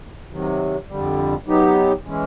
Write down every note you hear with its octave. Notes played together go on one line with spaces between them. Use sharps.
C3 D#3 F#3
F2 D3 G3
F#3 B3 D#4 G4
E3 G#3 C#4